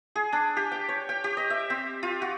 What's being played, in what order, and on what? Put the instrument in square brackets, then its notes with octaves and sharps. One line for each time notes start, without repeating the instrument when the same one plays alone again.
[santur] G#4
D4
G4
G5
C#5
G5
G4
D#5
E5
C4
F4
F#4